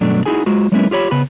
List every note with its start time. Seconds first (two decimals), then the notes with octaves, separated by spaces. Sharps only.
0.01 G2 B2 F#3 A3 D4
0.26 D#4 E4 F#4 G#4 G#5
0.46 G#3 F4 F#4
0.72 F#3 G#3 A#3 B3 C#4 E4
0.91 F4 G4 C#5 B5
1.11 C#3 B3 B5